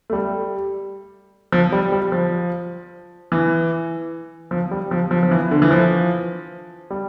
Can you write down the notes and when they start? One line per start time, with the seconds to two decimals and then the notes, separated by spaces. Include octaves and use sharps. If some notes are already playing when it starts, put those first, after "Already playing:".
0.10 A3
0.13 G3
1.52 F3
1.72 G3
1.92 G3
2.12 F3
3.32 E3
4.51 F3
4.71 G3
4.91 F3
5.11 F3
5.23 F3
5.31 E3
5.51 D3
5.62 E3
5.71 F3
6.90 G3